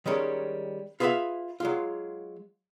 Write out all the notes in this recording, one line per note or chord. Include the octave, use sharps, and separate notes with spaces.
D#3 G3 G#3 C#4 A#4
F4 G#4 B4 D5 E5 F5
F#3 G#3 F4